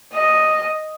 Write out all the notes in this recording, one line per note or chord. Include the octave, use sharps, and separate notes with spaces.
D#5